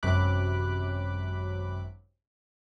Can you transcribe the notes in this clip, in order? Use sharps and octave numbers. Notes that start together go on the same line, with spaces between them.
G#1 F#2 C3 B5 D6 F#6